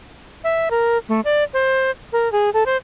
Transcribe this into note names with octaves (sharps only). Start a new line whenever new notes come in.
E5
A#4
A3
D5
C5
A#4
G#4
A4
C5